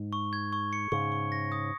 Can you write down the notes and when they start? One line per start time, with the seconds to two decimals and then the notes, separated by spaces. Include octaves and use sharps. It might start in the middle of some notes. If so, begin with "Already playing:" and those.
Already playing: G#2
0.13 C#6
0.33 G#6
0.53 C#6
0.73 C#7
0.92 G#2 C#3 C#6
1.12 C#6
1.32 A#6
1.52 D#6